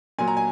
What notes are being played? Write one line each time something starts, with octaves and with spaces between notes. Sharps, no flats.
A#2 F#3 G#5
A#5
G#5